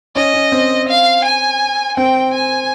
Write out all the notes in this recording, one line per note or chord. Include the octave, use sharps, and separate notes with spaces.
C#4 D#5
C#4
C4
F5
G#5
C4 G5
G#5